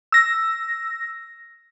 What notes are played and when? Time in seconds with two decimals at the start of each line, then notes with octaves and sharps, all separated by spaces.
0.12 E6 A#6